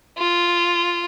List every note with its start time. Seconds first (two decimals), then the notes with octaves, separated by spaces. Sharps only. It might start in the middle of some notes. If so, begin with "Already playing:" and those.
0.18 F4